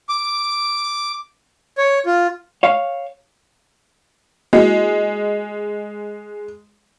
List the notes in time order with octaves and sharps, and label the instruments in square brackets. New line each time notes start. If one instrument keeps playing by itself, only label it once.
[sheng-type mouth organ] D6
C#5
F4
[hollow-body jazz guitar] C#5 F5
[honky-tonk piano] G#3 [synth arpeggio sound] A#3 E4 F#4